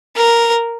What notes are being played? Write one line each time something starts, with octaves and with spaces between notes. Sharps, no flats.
A#4